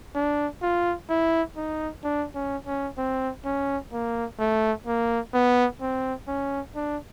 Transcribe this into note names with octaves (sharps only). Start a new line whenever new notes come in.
D4
F4
E4
D#4
D4
C#4
C#4
C4
C#4
A#3
A3
A#3
B3
C4
C#4
D4